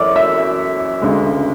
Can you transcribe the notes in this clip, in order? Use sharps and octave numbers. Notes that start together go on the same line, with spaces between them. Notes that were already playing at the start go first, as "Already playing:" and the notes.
Already playing: F#2 E3 C#5 D5 D6
E5 E6
D2 C#3 G#3